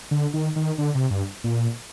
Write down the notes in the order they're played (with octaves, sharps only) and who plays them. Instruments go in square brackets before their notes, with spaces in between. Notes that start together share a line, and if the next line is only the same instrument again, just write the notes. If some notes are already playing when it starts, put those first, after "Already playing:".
[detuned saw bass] D3
D#3
D#3
D3
C3
G2
A#2